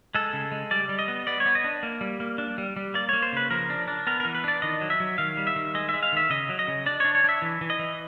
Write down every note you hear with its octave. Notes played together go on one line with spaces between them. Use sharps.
G#3 A4
C#3
G#3
G3 D5
G3
D#5
B3
B3 D5
C#5
B3
D#5
D4
A#3
G3
A#3
D4
G3
G3
A#3 D5
A#3 C#5
C5
C#3 B4
F3 A#4
D4
D4
B3 A#4
E3 A#4
B4
D4 D5
D#3 D#5
F#3
E5
F#3
D#3 F5
G3
E5
D#3
G#3 D#5
E5
G#3
F5
D#3 E5
C#3 D#5
F#3
D#5
C#3
D4 D5
D4 C#5
C#5
D4 E5
E3
E3
D#5
E3